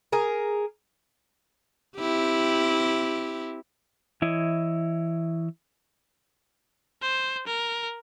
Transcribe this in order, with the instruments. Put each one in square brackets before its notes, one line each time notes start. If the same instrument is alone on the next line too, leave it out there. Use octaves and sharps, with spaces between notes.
[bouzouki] G#4 A#4
[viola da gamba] C4 E4 G4
[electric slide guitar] E3 E4 C#5 D#5
[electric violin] C5
A#4